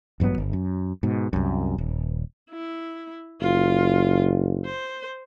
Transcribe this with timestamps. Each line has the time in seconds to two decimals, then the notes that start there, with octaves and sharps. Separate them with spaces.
0.20 A1 G2 F#3 B3
0.38 G1
0.53 F#2
1.03 G#2 B2
1.33 C2 F#2
1.78 D#1
2.51 E4
3.41 F#1 F4
4.65 C5